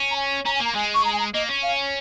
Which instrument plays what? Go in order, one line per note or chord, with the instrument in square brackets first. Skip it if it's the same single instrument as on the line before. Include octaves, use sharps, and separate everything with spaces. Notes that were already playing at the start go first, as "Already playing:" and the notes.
Already playing: [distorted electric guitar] C#4
[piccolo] A#5
G#5
[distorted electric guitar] C#4 [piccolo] A#5
[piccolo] G#5
[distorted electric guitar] A#3 [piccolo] A#5
[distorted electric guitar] G#3 [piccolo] G#5
[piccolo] C#6
A#5
G#5
A#5
[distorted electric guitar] A#3 [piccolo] D#5
[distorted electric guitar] C#4
[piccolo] F5